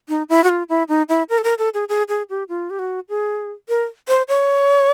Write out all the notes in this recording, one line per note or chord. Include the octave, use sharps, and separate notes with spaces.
D#4
E4
F#4
F4
E4
D#4
E4
A#4
A4
A#4
A4
G#4
G#4
G#4
G4
F4
G4
F#4
G#4
A#4
C5
C#5